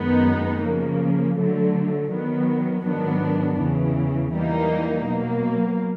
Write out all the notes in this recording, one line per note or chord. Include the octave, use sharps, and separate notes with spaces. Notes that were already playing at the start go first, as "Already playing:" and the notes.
Already playing: F#2 D#3 G#3 B3 D#4
C#3 F3 A#3
D3 F#3 A3
D#3 F#3 B3
G#2 D#3 F#3 B3 D4
E2 C#3 E3
E3 G3 A#3 D#4
B2 F#3 A#3